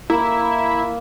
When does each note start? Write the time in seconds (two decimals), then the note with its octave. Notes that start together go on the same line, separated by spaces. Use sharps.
0.10 A#3 E4